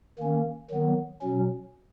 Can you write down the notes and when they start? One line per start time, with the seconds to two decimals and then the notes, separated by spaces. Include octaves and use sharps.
0.18 D#3 A#3 C#4
0.70 D#3 F#3 B3
1.21 B2 F#3 C#4